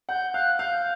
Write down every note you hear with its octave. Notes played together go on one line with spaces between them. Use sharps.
F#5 G6
F5 F#6
F5 G6